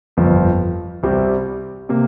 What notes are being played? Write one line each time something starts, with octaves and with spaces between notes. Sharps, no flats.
G1 F2 F3
C2 C3 G3 C4
C3 A#3